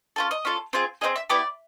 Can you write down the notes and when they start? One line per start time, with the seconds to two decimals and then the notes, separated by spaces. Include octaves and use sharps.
0.16 C#4 F4 A4
0.31 D#5
0.45 C#4 F4 A4
0.73 C4 F4 G#4
1.01 C4 F4 G#4 D#5
1.16 E5
1.30 B3 E4 G4 D5